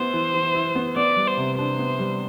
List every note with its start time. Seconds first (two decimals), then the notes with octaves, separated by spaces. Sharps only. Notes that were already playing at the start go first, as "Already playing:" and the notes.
Already playing: B3 E4 C5
0.13 E3
0.34 E3
0.55 E4
0.75 B3
0.96 B3 D5
1.16 G3
1.28 C5
1.37 C3
1.58 D4 C5
1.79 B3
1.99 G3